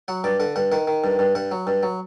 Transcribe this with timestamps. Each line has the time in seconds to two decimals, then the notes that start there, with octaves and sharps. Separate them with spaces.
0.08 F#3 F#5
0.24 G2 D5
0.40 D3 F#5
0.56 G2 F#5
0.72 D#3 F#5
0.87 D#3
1.04 G2
1.19 G2
1.35 G2 F#5
1.51 F#3
1.67 G2
1.83 F#3